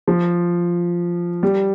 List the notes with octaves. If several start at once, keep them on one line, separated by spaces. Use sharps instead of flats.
F3
G3